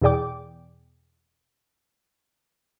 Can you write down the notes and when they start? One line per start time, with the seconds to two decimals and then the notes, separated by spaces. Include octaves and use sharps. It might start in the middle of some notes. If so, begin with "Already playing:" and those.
0.02 E2 B2 G#4 D5 G5 D6